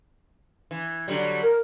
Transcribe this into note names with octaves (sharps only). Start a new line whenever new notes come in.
E3
D3 F#3 G3
A#4